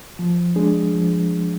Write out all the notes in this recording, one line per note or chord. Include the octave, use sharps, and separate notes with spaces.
F3
G#3 D4 G#4
F3